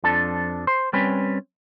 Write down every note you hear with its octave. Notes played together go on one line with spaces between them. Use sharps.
F2 F3 D4 A4
C5
G3 C4 C#4 B4